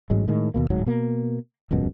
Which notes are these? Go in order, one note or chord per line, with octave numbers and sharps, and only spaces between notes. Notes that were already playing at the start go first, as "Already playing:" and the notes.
A1 G#2 F#3 G#3
A2 D#3 G#3
D#2 B2 A#3
D1 G#2 F#3
B2 A#3
D#1 C#2 F#2 B2